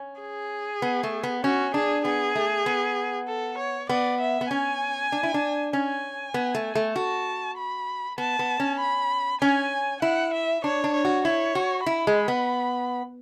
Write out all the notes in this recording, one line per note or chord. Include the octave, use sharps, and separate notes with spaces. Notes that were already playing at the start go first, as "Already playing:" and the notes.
Already playing: C#4
G#4
B3
A3
B3
C#4 F#4
D4 G#4
B3 G#4
A3
B3
A4
C#5
B3 D5
E5
B3
C#4 G#5
D4
E4
D4
C#4 G#5
B3
A3
A3
F#4 A5
B5
B3 A5
B3
C#4
B5
C#4 G#5
E4 F#5
E5
D4 C#5
D4
C#5
F#4
E4 C#5
F#4
E4 B5
G#3
B3